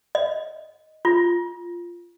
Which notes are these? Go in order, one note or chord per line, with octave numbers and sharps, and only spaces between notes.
D#5
F4